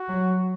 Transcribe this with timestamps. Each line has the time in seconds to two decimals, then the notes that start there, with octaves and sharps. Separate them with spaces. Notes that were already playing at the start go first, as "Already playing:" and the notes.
Already playing: F#4
0.09 F#3